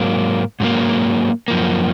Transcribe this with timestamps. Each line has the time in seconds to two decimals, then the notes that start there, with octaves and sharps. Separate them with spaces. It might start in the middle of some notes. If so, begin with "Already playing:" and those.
Already playing: G#2 F#3 A#3
0.60 G#2 F#3 A#3
1.48 F#2 F3 A#3